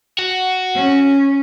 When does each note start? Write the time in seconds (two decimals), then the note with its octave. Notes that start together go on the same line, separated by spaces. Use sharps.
0.19 F#4
0.75 C#4